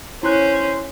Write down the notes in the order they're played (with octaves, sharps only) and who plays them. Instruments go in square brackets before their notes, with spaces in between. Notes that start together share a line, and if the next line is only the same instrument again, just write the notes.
[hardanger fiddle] C#4 [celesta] E4 F#6 [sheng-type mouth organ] C5